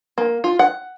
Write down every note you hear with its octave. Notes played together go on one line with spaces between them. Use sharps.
A#3
F4
F#5